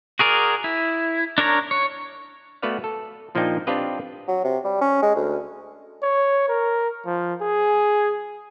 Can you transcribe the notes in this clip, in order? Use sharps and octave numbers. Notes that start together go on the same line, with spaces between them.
F#4 G#4 A#4 D5
E4
D4 A#4 C#5 A#5
C#5
A3 B3 F#4 B4 D5 F5
A4
A#2 F3 A#3 D4 D#4 G5
C4 D4 F4 G4 B4 D#5
F#3
C3
G3
C#4
G#3
D2
C#5
A#4
F3
G#4